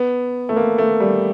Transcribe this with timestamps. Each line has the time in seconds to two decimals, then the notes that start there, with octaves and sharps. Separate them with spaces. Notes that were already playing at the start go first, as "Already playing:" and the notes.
Already playing: B3
0.49 A3
0.56 A#3
0.78 A3
1.00 G3